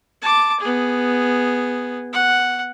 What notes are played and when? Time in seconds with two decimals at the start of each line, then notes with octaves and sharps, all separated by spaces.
0.22 A5 D6
0.60 B3 G#4
2.13 F#5